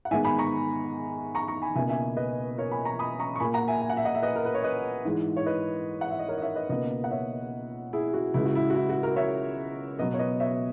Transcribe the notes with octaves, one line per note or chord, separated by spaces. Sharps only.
F#5
G#2 D#3 G#3 B3 E5 G#5
G#5 B5
A#5 C#6
A#5 C#6
A#5 C#6
G#5 B5
C#2 B2 A#3 E5 G#5
E5 G#5
B4 D#5
A#4 C#5
G#5 B5
A#5 C#6
B5 D#6
A#5 C#6
C#6
A#2 A#3 G#5 B5
F#5 A#5
E5 G#5
G#5
F#5
E5
D#5 F#5
E5
B4 D#5
A#4
B4
C#5
B4 D#5
G#2 E3 G#3
C#5
B4 D#5
F#5
E5
D#5
A#4 C#5
D#5
C#5 E5
B4 D#5
C#2 B2 A#3 B4 D#5
F#5
C#5 E5
E4 G#4
F#4
C#2 C#3 G#3 E4
F#4
E4
F#4
E4
F#4
F#4 A#4
C#5 E5
B2 F#3 B3 B4 D#5
C#5
B4 D#5
C#5 E5